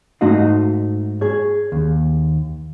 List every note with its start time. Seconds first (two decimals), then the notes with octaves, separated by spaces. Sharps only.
0.21 G#2 A3 D#4 F#4 D#5 F5
1.21 G#4 C#5
1.72 D#2